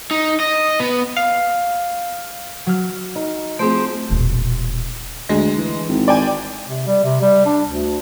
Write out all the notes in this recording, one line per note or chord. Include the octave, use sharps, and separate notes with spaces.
D#4
D#5
B3
F5
F#3 F6
D#4
F3 A3 C4 G#4 C5
E1 A#2
D2 G#3
E3
G#1
D5 G5 G#5
C3
G3
C3
G3
D4
D2